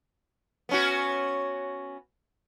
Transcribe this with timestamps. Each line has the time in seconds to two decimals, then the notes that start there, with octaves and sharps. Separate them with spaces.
0.69 B3 C#4 F#4